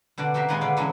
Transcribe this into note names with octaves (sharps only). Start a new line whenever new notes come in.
B2 D3 F#4 D5
C4 F#4 G4 A#4 E5 F5
A#2 D#3 G#3 B3 F#5 G#5
B2 D3 D4 B4 D5 F5
E3 F#3 G#3 C#4 D4